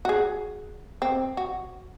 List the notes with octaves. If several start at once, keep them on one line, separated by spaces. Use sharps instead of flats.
F#4 G#4
C4
F#4